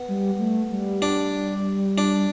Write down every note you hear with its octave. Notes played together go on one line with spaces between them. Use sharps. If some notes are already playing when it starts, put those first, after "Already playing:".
Already playing: B3
G3
A3
G3
D4
D4